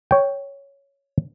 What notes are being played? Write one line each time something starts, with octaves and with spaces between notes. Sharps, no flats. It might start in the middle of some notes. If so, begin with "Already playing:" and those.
C#5 G5